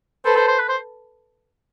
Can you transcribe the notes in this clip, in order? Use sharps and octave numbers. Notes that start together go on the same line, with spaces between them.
A4 B4 C5
C5
C5
B4
C5